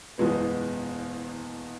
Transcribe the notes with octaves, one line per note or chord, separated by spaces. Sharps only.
F#1 E2 B2 G#3 B3